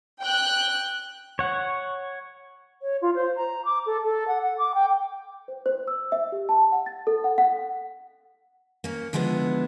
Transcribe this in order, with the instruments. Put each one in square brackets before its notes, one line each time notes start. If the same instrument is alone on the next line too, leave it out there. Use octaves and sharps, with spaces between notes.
[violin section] G5 F#6
[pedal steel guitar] C#5 F#5
[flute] C#5
F4
C5
A#5
D6
A4
A4
F#5
F#5
D6
G5
[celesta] C5
C5
E6
E5
G4
A5
F#5
A6
A4
F#5
F#5
[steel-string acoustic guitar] A#3 C#4
D3 F3 G#3 B3 E4